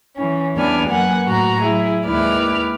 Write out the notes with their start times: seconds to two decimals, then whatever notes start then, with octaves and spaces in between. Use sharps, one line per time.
0.16 E3 C#4
0.55 E2 G3 B3 D4 G#5 F6
0.88 F#2 A#3 B4 F#5 G#5
1.26 A2 F#4 A#5
1.61 F#3 E4 G#4
2.06 D#2 G#3 E4 B4 D5 F6